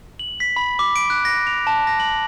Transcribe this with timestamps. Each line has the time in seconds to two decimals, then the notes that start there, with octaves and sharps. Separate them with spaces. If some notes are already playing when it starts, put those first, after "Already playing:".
0.19 F#7
0.40 B6
0.56 B5
0.79 D6
0.96 D7
1.10 F#6
1.25 A#6
1.47 F7
1.67 A5
1.87 A#6
2.00 F#7